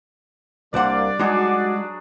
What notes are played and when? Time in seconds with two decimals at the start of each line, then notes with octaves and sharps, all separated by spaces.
0.74 C2 G3 A#3 D4 C5 D5 F#5
1.19 F#3 G#3 D4 D#4 F#4 G#4